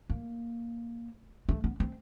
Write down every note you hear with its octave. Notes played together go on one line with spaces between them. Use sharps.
A#3
A3
B3
C4